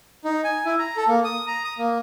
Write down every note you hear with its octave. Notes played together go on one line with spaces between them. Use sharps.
D#4
G#5
E4
A#5
A4
A#3
D#6
A#5
D#6
A#3